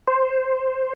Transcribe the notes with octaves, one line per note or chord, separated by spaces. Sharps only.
C5